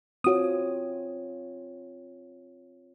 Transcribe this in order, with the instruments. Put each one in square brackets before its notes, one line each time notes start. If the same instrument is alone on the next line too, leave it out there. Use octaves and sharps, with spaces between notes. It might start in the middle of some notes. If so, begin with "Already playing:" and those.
[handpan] C4 F4 C#5 [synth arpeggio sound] F#4 D#6